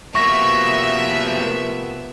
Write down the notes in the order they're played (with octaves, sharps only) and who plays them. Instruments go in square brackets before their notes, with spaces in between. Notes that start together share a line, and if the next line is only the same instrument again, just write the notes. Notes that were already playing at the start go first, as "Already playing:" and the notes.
[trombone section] C3 F3 B3 [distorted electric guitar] A#3 F#4 [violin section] E5 [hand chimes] C#6 A#6